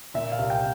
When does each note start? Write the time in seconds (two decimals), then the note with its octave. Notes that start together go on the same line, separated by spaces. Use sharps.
0.14 A#2 E5
0.32 F5
0.38 C2
0.50 G5